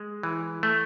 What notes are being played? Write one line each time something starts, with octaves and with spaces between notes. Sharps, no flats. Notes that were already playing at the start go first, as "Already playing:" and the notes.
Already playing: G#3
E3
A3